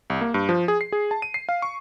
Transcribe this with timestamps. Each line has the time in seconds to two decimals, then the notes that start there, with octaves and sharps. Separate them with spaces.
0.10 C2
0.21 A#3
0.34 G2
0.49 F3
0.68 G#4
0.81 C7
0.92 G#4
1.11 A5
1.22 D#7
1.34 C7
1.49 F5
1.62 C#6